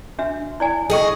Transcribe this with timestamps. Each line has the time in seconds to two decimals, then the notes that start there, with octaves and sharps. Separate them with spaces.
0.19 D4 F#4 E5
0.60 E4 D5 G#5
0.90 G#4 A4 D#5 G5 C#6